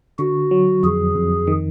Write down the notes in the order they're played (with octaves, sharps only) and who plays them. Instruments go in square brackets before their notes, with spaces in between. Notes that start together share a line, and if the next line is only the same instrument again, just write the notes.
[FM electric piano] D3 [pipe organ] F#4
[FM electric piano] F#3
[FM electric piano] F2 [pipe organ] G#4
[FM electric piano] F2
D#3